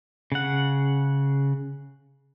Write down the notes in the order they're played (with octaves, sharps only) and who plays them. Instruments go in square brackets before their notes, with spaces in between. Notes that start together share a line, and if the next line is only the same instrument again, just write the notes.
[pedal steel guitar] C#3 F#5